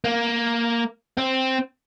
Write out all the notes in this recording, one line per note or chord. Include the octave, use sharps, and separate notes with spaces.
A#3
C4